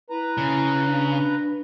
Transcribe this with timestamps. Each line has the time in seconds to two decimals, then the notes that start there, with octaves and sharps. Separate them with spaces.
0.10 E4 B4 A#5
0.38 C#3
0.85 D4